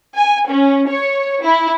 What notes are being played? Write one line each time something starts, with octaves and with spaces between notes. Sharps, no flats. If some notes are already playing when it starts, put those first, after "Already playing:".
G#5
C#4
C#5
E4